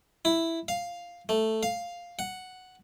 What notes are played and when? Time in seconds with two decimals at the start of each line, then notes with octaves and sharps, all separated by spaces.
0.25 E4
0.68 F5
1.29 A3
1.63 F5
2.19 F#5